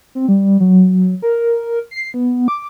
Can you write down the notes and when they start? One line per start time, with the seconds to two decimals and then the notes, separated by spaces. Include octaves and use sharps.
0.15 C4
0.28 G3
0.60 F#3
1.22 A#4
1.91 C7
2.14 B3
2.48 D6